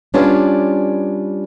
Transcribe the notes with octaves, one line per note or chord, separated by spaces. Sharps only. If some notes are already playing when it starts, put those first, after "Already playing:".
G3 C#4 D4 F4 B4 C#5